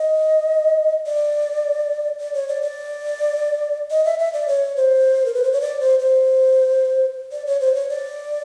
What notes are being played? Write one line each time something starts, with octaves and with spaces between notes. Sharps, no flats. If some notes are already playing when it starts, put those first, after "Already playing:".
Already playing: D#5
D5
D5
C#5
D5
D5
D#5
E5
E5
D5
C#5
C5
A#4
B4
C5
C#5
D5
C5
C5
D5
C#5
C5
C#5
D5